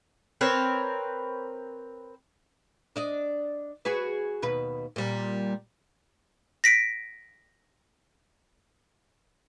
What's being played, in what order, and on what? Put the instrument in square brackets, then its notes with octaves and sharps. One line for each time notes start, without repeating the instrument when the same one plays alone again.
[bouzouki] C4 A#4 B4 C#5
[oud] D4 D5 D#5
F#4 G#4 B4
D#2 B2 B4
A#2 G3
[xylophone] A#6 B6 D7